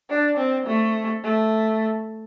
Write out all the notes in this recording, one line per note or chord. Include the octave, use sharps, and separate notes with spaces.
D4
C4
A3
A3